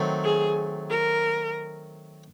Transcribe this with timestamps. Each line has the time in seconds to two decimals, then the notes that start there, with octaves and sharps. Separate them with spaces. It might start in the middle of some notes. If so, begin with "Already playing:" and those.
Already playing: D#3 F#3 A3 C4
0.24 G#4
0.90 A#4